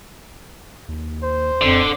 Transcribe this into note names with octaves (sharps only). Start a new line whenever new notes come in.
D#2
C5
D1 F2 D3